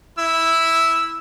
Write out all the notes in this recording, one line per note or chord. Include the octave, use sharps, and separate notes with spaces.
E4 E6